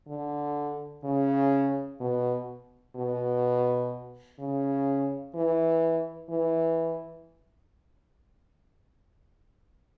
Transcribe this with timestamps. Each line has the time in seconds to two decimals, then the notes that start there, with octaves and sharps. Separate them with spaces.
0.08 D3
1.04 C#3
2.00 B2
2.96 B2
4.39 C#3
5.34 E3
6.30 E3